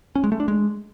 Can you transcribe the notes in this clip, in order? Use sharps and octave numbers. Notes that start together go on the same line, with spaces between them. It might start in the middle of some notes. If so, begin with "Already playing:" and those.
C#4
G#3
A3
D4
G#3